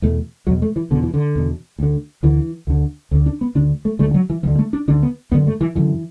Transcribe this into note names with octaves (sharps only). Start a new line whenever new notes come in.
E2 B2 A3
E2 B2 F#3
A3
E3
E2 B2 D3
E3
D3
E2 B2
D2 D3
D2 D3 E3
D2 D3
D2 D3
D4
B3
D2 D3 D4
A3
D2 D3 A3
F#3
E3
D2 D3 E3
A3
D4
D2 D3 D4
B3
F#2 D3 B3
A3
E3
F#2 D3 E3